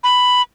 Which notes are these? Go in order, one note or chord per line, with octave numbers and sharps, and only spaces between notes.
B5